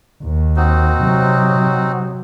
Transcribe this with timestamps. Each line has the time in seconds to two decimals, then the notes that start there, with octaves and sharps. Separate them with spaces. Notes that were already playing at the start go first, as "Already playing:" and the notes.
0.23 D#2
0.56 C4 D#4 F#4
1.02 C3 F#3